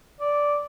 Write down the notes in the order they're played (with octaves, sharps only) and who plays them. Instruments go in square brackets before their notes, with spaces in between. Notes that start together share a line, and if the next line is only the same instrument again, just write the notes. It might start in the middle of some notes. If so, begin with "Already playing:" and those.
[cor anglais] D5